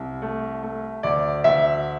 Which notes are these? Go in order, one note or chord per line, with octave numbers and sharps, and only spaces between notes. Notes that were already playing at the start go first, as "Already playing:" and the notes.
Already playing: C2
A3
A3
D2 D5
D2 E5